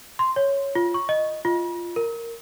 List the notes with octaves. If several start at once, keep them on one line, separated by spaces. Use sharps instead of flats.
C6
C#5
F4
C#6
D#5
F4
A#4